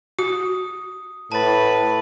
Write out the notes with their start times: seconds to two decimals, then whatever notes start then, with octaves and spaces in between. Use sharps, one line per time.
0.19 F#4 D#6
1.32 A2 B4 A5 A6